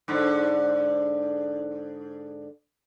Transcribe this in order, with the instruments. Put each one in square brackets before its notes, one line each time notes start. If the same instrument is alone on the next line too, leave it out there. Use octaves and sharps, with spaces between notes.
[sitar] G#2 D3